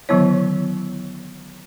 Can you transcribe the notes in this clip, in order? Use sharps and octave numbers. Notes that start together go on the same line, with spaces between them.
D3 D#3 F#3 B3 E4 C#5